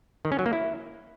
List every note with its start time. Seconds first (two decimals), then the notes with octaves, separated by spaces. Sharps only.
0.25 D#3
0.32 C#4
0.39 F#3
0.46 A#3
0.53 E4